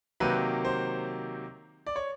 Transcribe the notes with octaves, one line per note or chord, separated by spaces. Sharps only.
C3 D#3 F#3 A#3 B4
C5
D5
C#5